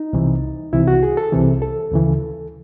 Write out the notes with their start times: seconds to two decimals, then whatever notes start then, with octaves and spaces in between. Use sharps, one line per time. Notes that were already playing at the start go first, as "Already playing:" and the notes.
Already playing: D#4
0.13 C2 C3 E3
0.73 C2 C3 E3 E4
0.88 F#4
1.03 G#4
1.17 A4
1.32 C2 C3 E3
1.62 A4
1.92 D2 C#3 E3